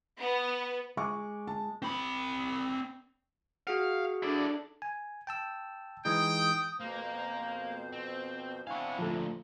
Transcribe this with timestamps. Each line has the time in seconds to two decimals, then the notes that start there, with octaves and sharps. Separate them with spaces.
0.19 B3
0.97 G#3 C#6 D6
1.47 A5
1.82 C4 B5
3.67 F#4 G#4 F5 F#5
4.23 D4 E4 A4 D5
4.82 G#5
5.27 G5 A5 E6
6.05 E3 G#3 D#4 G5 D#6
6.80 F2 B2 A#3 A#4 C5
7.92 C4
8.67 B3 C4 D4 E4 F5 G#5 C#6
8.99 D2 A#2 F3 A4